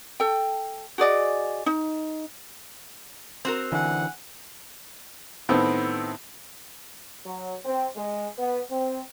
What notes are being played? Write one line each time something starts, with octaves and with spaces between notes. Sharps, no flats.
A4 G5
F#4 G#4 D5 D#5
D#4
C4 F#4 A#4
D3 E3 F#5 G#5
A2 D#3 B3 C4
F#3
C4
G#3
B3
C4